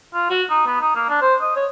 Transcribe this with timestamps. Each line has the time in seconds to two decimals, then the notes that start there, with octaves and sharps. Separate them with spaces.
0.13 F4
0.30 F#4
0.50 D#4
0.67 B3
0.81 D#4
0.96 A#3
1.09 D4
1.21 C5
1.41 D#5
1.56 C#5